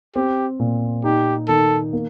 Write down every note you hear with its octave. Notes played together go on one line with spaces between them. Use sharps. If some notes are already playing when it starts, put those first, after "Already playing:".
C4 G4
A#2
D#4 G4
D#3 A4
A#3